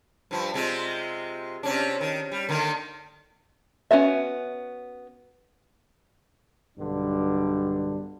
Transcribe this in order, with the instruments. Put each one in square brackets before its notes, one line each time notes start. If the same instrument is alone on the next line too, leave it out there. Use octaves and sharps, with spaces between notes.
[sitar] G2 F3
C3 G#3 F4
C3 C#4 D4
D#3
G3
D3 D#3 A#3
[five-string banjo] B3 C#4 F#4 A4 E5
[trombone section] B1 G2 D3 D4